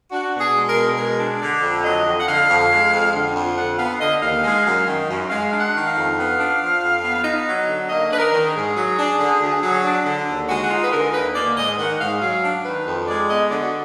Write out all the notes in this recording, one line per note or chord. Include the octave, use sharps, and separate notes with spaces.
D4 F#4
B2
G#4
G#3
A#4
B2
G#3 A#4
D4
D3 D5
F2
F#3 D#5
F2
F#5
D3 F5
F2
G#3
F2
D3
F2
F3 F#5
B3 F5
D3 D#5
D#2 F5
G#3
F#2
D#3
F#2
G#3 F5
D4
F#5
D#3
F5
F2
B3
D4
F3
F2
B3
D#4
F#3
D3
A#3 D#5
D4 B4
A#4
D#3
G#4
G#2
F#3
D4
D3
D2
F#3
D4
D3
D#2
G#3 F#4
F#4
D#4 F4
B4
D3 A#4
D#2 B4
A#3 D5
G#2 D#5
D#3 F#5
G#2 F5
F#3 F5
D4
D#3 B4
F2
G#3 D5
B3 D#5
D3 D5
F#4